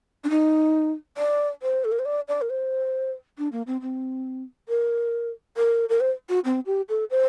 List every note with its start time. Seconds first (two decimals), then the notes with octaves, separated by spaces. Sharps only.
0.24 D4
0.30 D#4
1.17 D5
1.62 C5
1.84 A4
1.92 A#4
1.99 C5
2.05 D5
2.28 D5
2.41 A#4
2.50 C5
3.38 D4
3.52 A#3
3.67 C4
3.81 C4
4.69 A#4
5.57 A#4
5.89 A#4
6.00 C5
6.29 F#4
6.45 C4
6.66 G4
6.89 A4
7.10 C5